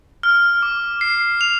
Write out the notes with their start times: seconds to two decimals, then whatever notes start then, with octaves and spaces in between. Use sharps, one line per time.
0.23 F6
0.63 D6
1.01 C7
1.41 F7